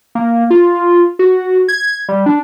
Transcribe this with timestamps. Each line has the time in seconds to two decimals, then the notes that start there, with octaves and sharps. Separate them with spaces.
0.15 A#3
0.50 F4
1.19 F#4
1.68 G#6
2.09 G3
2.26 D4